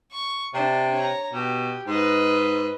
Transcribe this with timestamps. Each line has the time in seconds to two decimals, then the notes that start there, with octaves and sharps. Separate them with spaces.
0.12 C#6
0.54 C3 D4
0.94 C#5 A#5
1.33 B2 G4
1.87 G#2 B4 D#5